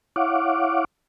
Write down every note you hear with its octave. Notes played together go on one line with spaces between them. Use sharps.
E4 C#5 F5 F#5 D6